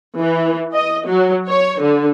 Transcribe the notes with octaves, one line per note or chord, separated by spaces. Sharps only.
E3
D#5
F#3
C#5
D3